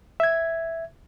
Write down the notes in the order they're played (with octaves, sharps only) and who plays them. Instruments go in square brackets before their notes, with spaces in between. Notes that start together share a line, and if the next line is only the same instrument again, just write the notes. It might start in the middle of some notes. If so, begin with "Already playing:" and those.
[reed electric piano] E5 G#6